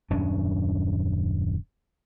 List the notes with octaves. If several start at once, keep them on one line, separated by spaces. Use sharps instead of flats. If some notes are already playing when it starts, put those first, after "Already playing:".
D#1 F#2 C#4 D4